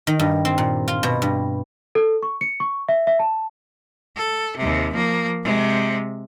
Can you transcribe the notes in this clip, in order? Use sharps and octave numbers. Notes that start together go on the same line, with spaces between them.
D#3
G2
C4
A#2
F4
B2
G2
A4
C#6
C#7
C#6
E5
E5
A5
A4
D#2 C3
F3 A#3
C3 G#3